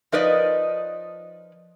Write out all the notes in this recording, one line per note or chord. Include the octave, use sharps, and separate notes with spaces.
F3 D#4 A#4 B4 D5 D#5